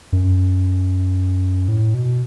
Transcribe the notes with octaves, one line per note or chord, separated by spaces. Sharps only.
F#2
A2
B2